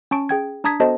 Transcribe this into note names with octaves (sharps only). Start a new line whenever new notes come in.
C#4 A5 C#6 D7
G#4 G5 G#6
D4 A5 A#5 D#6 G#6 B6
B3 F#4 A4 C5 D#5 A5